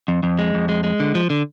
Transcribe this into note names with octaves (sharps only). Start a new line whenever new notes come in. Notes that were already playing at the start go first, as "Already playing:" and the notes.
F2
F2
G#3
F2
G#3
G#3
D3
F3
D3